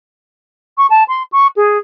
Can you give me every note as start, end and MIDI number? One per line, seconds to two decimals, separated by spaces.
0.78 0.87 85
0.90 1.04 81
1.08 1.23 84
1.32 1.47 85
1.56 1.78 68